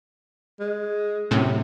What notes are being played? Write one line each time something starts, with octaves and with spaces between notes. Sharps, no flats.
G#3
F#2 A2 C3